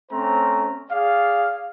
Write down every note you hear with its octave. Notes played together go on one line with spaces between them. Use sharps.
A3 C4 C#4 C5 A#5
G#4 D5 F5